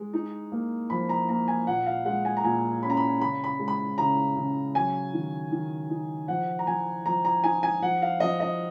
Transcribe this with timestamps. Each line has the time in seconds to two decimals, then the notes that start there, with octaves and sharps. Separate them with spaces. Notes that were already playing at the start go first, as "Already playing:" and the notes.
Already playing: G#3
0.14 D#4
0.52 A#3
0.90 F3 B5
1.09 A#5
1.29 A#3 A#5
1.48 G#5
1.67 A#2 F#5
1.86 F5
2.05 G#3 F#5
2.25 G#5
2.37 A#5
2.44 A#2 G#5
2.82 C#4 B5
2.90 A#5
2.97 B5
3.21 C#3 B5
3.44 B5
3.59 G#3
3.68 B5
3.98 C#3 A#5
4.36 C#3
4.75 F#3 G#5
5.13 D#3
5.52 D#3
5.90 D#4
6.28 F3 F#5
6.59 A#5
6.67 F3 G#5
7.06 F3 A#5
7.25 A#5
7.44 D#4 G#5
7.63 G#5
7.82 F3 F#5
8.02 F5
8.20 F3 D#5
8.40 D#5